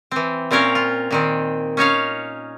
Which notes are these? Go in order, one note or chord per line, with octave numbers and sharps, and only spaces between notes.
E3 C4
A#2 C4 C#4 A#4 C#5 F5
F4
A#2 D#3 C4
C#4 D#4 C#5 F5